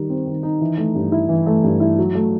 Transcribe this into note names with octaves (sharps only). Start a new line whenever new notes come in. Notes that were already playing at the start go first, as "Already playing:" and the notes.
Already playing: D#3 G3 D#4
C4
D#3
D#4
E3
A3
G2
E4
E3
A3
G2
E4
F#3
A3